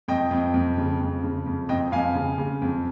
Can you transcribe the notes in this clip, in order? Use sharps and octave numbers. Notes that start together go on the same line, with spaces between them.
F2 D#5 G5
F2
F2
C#3
F2
C#3
F2
F2 D#5 G5
F2 F5 G#5
C#3
C#3
F2